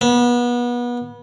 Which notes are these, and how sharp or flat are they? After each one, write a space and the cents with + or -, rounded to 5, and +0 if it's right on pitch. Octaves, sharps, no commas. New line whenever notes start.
B3 -30